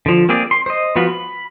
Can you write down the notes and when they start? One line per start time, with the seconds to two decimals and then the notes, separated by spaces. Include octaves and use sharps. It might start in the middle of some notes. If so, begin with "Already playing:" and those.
0.06 D3 F3
0.29 A#3 C4 G#4 D5
0.51 C6
0.66 C5 D#5
0.96 F3 B3 F4 F#4
1.09 B5